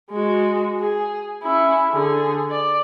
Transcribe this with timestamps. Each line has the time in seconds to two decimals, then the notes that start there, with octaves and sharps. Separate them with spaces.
0.11 G#3 F#4
0.80 G#4
1.43 C#4 E4
1.91 D3 G#4
2.50 D5